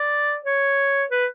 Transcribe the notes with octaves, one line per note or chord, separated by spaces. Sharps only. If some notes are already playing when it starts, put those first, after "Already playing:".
Already playing: D5
C#5
B4